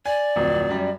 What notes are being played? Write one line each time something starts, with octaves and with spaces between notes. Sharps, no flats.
D5 G#5
D1 F2
F#2 G3